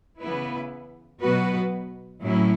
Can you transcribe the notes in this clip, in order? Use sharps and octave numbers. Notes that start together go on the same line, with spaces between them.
C#3 E3 B3 E4 B4
B2 F#3 B3 F#4 B4
A2 F#3 C#4 E4